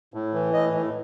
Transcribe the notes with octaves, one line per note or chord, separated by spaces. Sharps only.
A2
E3
A2 D#5
A2